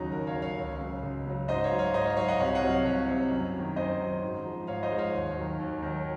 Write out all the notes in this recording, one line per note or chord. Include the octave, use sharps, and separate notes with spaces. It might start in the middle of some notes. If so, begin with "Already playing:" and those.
Already playing: D#2 C#3 F#3 D#4 F#4
D#2 F#4 A#4
C#5 F5
C#3 F#3
C#5 F5
C#2
C#3 F#3
C#2
C#3 F#3
G#2 C5 D#5
C#5 F5
F#3
C#5 F5
G#2 C5 D#5
C#5 F5
F#3 C#5 F5
D#5 F#5
C2 C#5 F5
D#5 F#5
C3 F#3
C#5 F5
C2 C#5 F5
C3 F#3
F#2
D#3 F#3
F#2 C5 D#5
D#3 F#3
G#2
F3 G#3
G#2 C#5 F5
C5 D#5
F3 G#3
C#5 F5
D#2
D#3 F#3
D#2
D#3 F#3